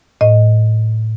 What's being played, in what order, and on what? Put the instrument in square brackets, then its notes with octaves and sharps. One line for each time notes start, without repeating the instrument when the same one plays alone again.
[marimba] A2 D#5